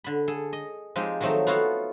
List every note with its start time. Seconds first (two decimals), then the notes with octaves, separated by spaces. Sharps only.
0.04 D3 B5
0.28 G#4 A4
0.53 D#5
0.96 F3 G#3 C4 D#4 G4
1.20 D#3 F3 F#3 A3 C4 D#4
1.47 B3 F4 F#4 A4 C#5 F5